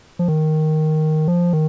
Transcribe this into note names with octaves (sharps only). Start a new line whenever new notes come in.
F3
D#3
F3
D#3